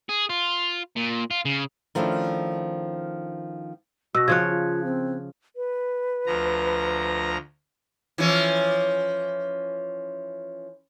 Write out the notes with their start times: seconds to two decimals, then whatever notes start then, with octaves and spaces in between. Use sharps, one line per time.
0.09 G#4
0.30 F4
0.96 A#2
1.31 F4
1.45 C#3
1.95 D#3 F3 A3 C#4 D4 E4
4.15 B2 F#4 E6 A#6
4.28 C#3 F3 C#5 F#6 G#6
4.50 F4
4.84 C4
5.56 B4
6.27 D2 F3 A#5
8.18 E3 F3 C#4